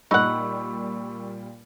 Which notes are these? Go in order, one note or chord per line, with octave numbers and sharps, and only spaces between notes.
A#2 G3 D#4 F#5 B5 C#6 E6